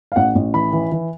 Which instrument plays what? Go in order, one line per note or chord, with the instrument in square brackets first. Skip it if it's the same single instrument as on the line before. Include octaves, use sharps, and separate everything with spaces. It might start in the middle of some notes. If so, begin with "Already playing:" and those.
[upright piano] F5
A1 F#5
A1
E3 B5
E3
E3